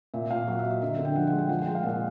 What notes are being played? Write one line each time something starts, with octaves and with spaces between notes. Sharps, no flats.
A#2 E5
A#2 F5
F#3 F#5
E5
F#3
D#5
D3 E5
D3
G5
F3 F#5
F#5
G#3
G5
F3 F#5
G5
G#3
F5
A#2 F#5